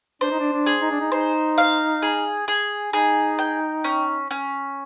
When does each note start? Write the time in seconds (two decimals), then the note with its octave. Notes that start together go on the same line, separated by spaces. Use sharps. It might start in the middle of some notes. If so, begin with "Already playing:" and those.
0.21 D4 C5
0.31 D#4
0.40 D4
0.52 D4
0.67 G#4
0.82 D#4
0.91 D4
1.00 D#4
1.12 D#4 C5
1.58 F5
2.02 G#4
2.48 G#4
2.93 D#4 G#4
3.39 G5
3.84 C#4
4.31 C#4